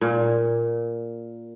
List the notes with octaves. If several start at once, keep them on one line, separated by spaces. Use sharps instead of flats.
A#2